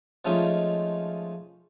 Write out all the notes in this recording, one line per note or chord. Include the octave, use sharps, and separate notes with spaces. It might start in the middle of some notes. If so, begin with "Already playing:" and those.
F3 G#3 A3 C#4 D#4 F4